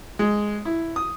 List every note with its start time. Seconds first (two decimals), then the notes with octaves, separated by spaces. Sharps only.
0.19 G#3
0.65 E4
0.96 D#6